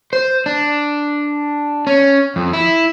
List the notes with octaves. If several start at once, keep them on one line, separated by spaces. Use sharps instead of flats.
C5
D4
C#4
F2
E4